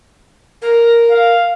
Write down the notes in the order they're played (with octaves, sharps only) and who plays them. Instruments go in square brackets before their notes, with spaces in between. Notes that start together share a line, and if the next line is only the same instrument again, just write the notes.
[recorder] A#4
[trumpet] F5